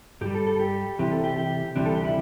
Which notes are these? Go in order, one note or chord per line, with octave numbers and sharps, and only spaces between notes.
G2 G3 G4
A4
A4
G4
C2 C3 E3 G4
A4
G4
G4
D2 C3 E3 G3 D4
A4
G4
E4